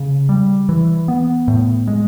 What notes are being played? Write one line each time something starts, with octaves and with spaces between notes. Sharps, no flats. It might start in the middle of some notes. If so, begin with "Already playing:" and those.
Already playing: C#3
G3
E3
B3
A2
G#3